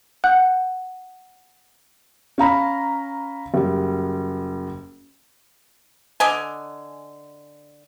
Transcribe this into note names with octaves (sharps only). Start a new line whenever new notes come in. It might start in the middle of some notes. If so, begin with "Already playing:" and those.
F#5 F#6 G6
C#4 F5 A#5 B5
F#1 G3
D3 D#5 G#5